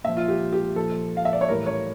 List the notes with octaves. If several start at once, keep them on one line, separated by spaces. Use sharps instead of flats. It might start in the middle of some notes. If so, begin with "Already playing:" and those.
A#2 F3 E5
F4
G4
G4
A#2 F3 A4
F5
E5
D5
C#5
A2 E3 G3 A#4
C#5